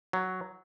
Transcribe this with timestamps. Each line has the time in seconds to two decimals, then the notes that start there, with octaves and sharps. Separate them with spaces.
0.13 F#3